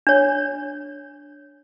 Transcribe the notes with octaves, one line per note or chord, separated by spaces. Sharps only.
D4 C#5